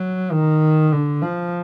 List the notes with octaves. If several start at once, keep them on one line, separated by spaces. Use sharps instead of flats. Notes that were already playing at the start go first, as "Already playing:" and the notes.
Already playing: F#3
D#3
D3
F3